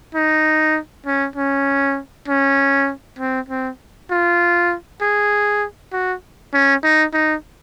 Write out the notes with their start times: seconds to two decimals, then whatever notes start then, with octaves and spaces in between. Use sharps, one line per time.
0.15 D#4
1.06 C#4
1.36 C#4
2.28 C#4
3.19 C4
3.49 C4
4.11 F4
5.01 G#4
5.92 F#4
6.53 C#4
6.84 D#4
7.14 D#4